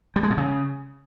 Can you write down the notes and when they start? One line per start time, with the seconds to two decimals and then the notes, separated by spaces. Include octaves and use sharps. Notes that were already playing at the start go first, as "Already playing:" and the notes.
0.16 G3
0.23 G#3
0.30 B2
0.38 C#3